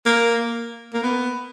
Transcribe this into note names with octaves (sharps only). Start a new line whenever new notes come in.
A#3
A#3
B3